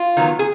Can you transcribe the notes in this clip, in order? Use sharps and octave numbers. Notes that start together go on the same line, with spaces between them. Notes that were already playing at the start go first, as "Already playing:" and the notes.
Already playing: F4
D#3 F#3 B3
G#4